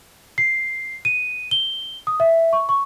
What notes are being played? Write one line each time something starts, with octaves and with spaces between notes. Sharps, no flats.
C7
D#7
G7
D#6
E5
C#6
C#6